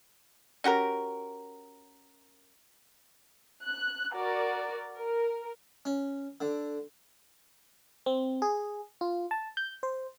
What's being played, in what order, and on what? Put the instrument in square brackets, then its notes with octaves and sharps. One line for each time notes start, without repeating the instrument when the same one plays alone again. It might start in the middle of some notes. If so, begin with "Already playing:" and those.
[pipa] C#4 F#4 G4 A#4
[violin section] F#6
F#4 A#4 D5
A#4
[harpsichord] C#4
D3
[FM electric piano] C4
G#4
F4
A5
G6
C5